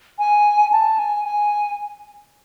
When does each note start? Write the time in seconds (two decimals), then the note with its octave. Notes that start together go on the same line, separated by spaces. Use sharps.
0.19 G#5
0.72 A5
0.99 G#5
1.25 G#5